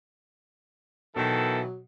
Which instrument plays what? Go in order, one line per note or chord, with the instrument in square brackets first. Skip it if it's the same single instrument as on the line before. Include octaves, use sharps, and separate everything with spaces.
[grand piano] B2 [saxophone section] D#3 E3 [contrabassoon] F#3 [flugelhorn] A4